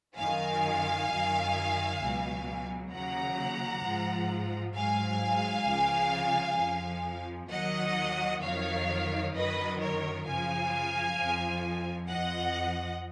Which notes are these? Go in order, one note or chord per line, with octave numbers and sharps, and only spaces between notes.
F#2 D#3 F#3 F5 G#5
F#2 D#3 F#3
C#2 B2 F#3
D#2 C#3 F#3 F#5 A#5
G#2 F3
G#2 F#3 F5 G#5
C#2 C#3 F3
F2 F3
D#2 D#3 F#3 D#5 F#5
F2 D#3 F#3 C#5 F5
F#2 D#3 F#3 B4 D#5
A#4 C#5
F#2 C#3 F3 F5 G#5
F2 F3
F2 F3 D#5 F#5